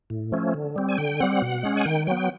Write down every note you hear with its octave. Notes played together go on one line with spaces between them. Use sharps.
A2
F3 A3 C#4
D3
G3 C4
G#5
D3 G5
G3 C4 F#5
B2
G#3 C#4
G#5
D#3 G5
F#3 B3 G5